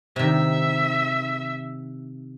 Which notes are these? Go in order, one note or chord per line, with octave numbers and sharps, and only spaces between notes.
C3 D#3 E5